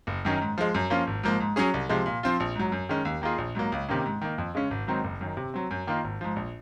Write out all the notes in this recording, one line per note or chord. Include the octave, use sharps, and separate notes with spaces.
F#1
F#2 D#3 F#3 C#4
G#2
F3 G#3
F#2
F3 A#3 C#4 F4
G#1
G#2 F3 A#3
G#2
F#3 C#4 G#4
C2
C3 F3 G#3
A#2
F3 C4 F4
A#1
G#2 F#3
F#2
D#3 G#3 C#4
D#2
D#3 A#3 F4 G#4
A#1
G#2 F#3 A#3
C#2
C3 D#3 A#3 C#4
G#2
D#3 A#3
F2
C#3 G#3 C#4
G#1
G#2 D#3 F#3 C4
F#1
F#2 D#3
C3
F#3 C4
F#2
D#3 A#3 F4
G#1
G#2 F3
A#1